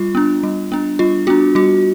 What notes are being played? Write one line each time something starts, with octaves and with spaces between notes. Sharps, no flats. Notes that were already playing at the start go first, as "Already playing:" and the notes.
Already playing: G3 F4
B3 D4
G3
B3 D4
G3 F4
B3 D4 F#4
G3 F#4